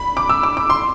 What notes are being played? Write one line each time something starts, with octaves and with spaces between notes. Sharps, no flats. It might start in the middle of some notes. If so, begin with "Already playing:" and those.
Already playing: B5
D6
E6
D6
D6
C6